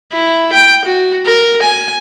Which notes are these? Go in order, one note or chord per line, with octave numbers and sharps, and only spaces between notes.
E4
G5
F#4
A#4
G#5